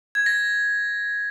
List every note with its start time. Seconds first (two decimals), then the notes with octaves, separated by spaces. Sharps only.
0.15 G#6
0.26 A#6